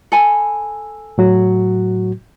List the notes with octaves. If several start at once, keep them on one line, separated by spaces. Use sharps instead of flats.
A4 G#5 B5
A2 F#3 F#4